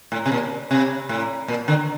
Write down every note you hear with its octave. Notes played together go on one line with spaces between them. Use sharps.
A2
C3
A#2
C3
A2
A#2
D3